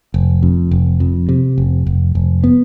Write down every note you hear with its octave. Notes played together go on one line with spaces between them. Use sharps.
F1
F2
F1
F2
C3
F1
F1
F1
B3